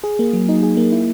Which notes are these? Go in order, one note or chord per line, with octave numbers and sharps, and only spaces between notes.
G#4
A#3
F#3
D#4
G#4
A#3
E4